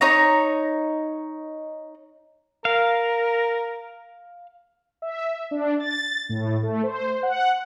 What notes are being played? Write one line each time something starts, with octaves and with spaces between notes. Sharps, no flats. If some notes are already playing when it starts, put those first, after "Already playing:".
D#4 C#5 A#5
A#4 F5
E5
D4
A6
A2
A3
C5
F#5